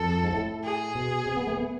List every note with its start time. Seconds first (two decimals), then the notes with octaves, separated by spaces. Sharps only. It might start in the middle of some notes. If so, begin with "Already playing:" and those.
Already playing: F2 A4
0.24 G#2
0.33 A2
0.63 G#4
0.95 B2
1.26 C3
1.37 B3
1.47 A3
1.57 B3